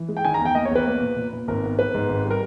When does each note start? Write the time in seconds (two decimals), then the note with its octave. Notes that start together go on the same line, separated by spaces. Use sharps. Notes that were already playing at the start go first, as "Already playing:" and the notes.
Already playing: E3
0.09 G#3
0.17 G5
0.25 D#3 G#5
0.34 A#5
0.40 E2
0.45 G5
0.55 A#3 D#5
0.65 C#5
0.71 E2 B4
0.87 A#3
1.01 A#2
1.16 A#2
1.32 A#2
1.48 G#1 A#4
1.64 B3
1.79 B3 B4
1.94 G#2
2.09 G#1
2.25 G3
2.30 A#4